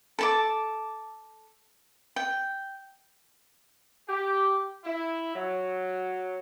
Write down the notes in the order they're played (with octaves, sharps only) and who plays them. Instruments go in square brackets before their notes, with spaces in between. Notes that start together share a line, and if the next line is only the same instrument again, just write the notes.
[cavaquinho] A4 A5 D6
G5
[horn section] G4
E4
F#3